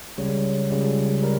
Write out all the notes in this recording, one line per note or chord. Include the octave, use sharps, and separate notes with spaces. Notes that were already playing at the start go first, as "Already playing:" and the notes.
C#2 C#3 G3 C#5
C#2 C#3 G3
G3 A#4